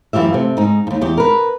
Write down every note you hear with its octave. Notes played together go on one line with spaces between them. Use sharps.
F#2 E3 F4 G4 E5
C3 A3
G#2 D#4
D#2 G#2
E2 G4
A#4 B4